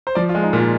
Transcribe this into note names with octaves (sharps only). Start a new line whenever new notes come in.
C5
F3 D5
F4
G#3
D#4
A#2 F4